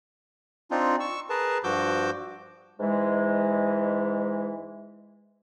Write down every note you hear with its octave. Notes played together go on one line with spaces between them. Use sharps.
C4 D4 D#4 F4
C#6 E6
G#4 A#4 B4 A5
G2 F3 F#4 D6 E6 G6
G#2 E3 G#3